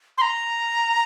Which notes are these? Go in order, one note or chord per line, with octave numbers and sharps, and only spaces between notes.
C6
A#5